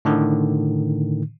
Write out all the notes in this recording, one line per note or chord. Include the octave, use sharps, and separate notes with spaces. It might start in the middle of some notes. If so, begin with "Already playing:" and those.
A2 D3 D#3